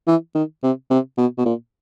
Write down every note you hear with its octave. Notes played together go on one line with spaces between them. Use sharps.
E3
D#3
C3
C3
B2
B2
A#2